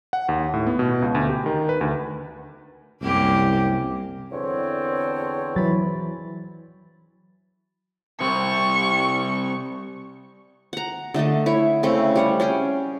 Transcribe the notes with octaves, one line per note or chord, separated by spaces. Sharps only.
F#5
D#2
A2
B3
B2
C#2
D2
G4
D#3
B4
D2
C2 F#2 A#3 G4
E2 D3 C4 C#5
E3 F#3 B5 A6
C3 G3 C4 C#6
F#5 A#5
D3 A3 D#5 A5
E4 C#5
C#3 A3 C4
G3 C#5 F#5
C#4 G#4 G5